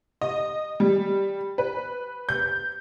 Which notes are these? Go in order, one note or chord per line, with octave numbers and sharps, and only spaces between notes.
D#5
G3
B4
G6